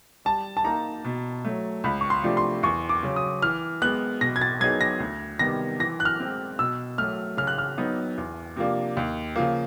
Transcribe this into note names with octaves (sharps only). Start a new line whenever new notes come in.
G3 A5
A5
A#3 D#4 A#5
B2
F#3 A3
C#2 B5
C#6
C6
C3 F3 A3 D4
C6
E2 C#6
D6
C#3 F#3
D#6
E3 F6
G#3 B3 F#6
B2 A#6
G#6
A6
F#3 B3 D#4 G#4 G#6
A#6
D2
C3 D#3 G3 B3 A#6
E3 A#6
F#6
F6
G#3 C4
B2 E6
F#3 A3 F6
C#3 F6
F#6
F6
F#3 B3 D#4
E2
C3 F3 A#3 D4
D#2
C#3 F3 A#3